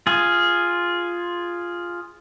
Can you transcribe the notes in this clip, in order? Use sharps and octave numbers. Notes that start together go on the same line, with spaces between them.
F4 G#4